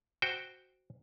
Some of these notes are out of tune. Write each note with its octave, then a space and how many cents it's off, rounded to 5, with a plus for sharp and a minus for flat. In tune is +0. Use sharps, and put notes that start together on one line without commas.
F#4 +0 C5 +0 G5 +0